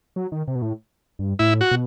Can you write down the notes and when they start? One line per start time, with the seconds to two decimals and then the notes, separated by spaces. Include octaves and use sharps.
0.16 F#3
0.32 D#3
0.48 C3
0.55 B2
0.62 A2
1.19 G2
1.39 A2 E4
1.61 F#4
1.71 B2